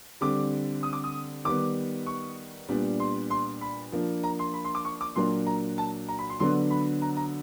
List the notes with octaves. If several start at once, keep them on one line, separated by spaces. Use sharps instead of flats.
D3 G3 C4 D6
D#6
D6
D#6
D#3 G3 B3 D6
C#6
A#2 G3 B3 D4
C6
C6
B5
F3 A#3 D4
A#5
C6
B5
C6
D6
C#6
D6
A#2 F#3 A#3 D4 C6
A#5
A5
A#5
B5
C6
D3 F#3 B3 D4 C6
B5
A#5
A#5